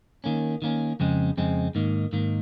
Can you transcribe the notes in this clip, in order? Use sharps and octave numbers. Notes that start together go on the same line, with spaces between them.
D#3 A#3 C#4
D#3 A#3 C#4
F2 C#3 G#3 C4
F2 C#3 G#3 C4
G#2 D#3 A#3
G#2 D#3 A#3